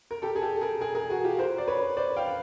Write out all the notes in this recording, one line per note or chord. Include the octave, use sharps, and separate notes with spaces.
A#4
G4 A4
G#4
G4 A4
G#4 A#4
G#4 A#4
G#4 A#4
F#4 G#4
F4 G4
A#4 C5
D5
B4 C#5
C5 D5
F5 G5